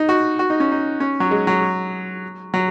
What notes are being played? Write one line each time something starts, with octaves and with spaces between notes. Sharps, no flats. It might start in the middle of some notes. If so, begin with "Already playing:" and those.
Already playing: D#4
F#4
F#4
D#4
C#4
D#4
C#4
F#3
G#3
F#3
F#3